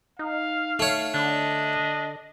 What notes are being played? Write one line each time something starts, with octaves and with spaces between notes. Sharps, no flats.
D#4 F5
A3 C#5
D3 D4 D#5